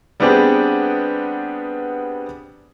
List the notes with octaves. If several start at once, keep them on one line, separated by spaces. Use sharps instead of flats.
G3 B3 C4 D4 G4 G#4